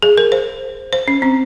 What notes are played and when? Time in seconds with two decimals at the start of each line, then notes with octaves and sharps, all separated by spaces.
0.03 G#4
0.18 A#4
0.32 C5
0.93 C5
1.08 C#4
1.22 C4